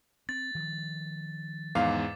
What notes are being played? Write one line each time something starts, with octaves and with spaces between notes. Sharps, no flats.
C4 A6
D#3 F3 G3
E2 G#2 F5 D6